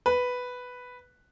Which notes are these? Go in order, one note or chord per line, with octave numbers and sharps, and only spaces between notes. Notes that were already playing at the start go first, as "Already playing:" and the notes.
B4